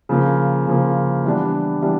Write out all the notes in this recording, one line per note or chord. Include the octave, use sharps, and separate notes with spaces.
C#3 F3 A#3
C#3 F3 A#3
E3 G3 B3 D4
E3 G3 B3 D4